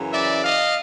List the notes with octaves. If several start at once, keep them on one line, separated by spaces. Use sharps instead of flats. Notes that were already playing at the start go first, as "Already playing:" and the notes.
Already playing: F#2 C#3 E3
D5 E5
D#5 F5